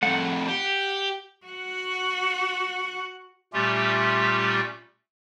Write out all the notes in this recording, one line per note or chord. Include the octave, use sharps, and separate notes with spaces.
F2 A2 F#5
G4
F#4 F#5
A#2 G3 A3 C#4 F4 G4